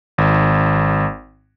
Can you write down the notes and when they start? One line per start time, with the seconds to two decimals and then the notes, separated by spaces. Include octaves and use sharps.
0.18 G#1